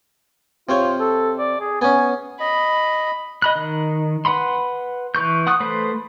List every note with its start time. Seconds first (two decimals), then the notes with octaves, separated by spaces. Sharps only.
0.69 C3 F4 C5 C#5
1.00 A4
1.39 D5
1.60 G#4
1.81 B3 C#4 G#5
2.40 D#5 B5
3.42 D#5 B5 F#6
3.56 D#3
4.25 B4 F#5 B5 C6
5.15 E3 B4 C#6 G6
5.47 F#5 C#6 D#6 F#6
5.60 A3 B4 C5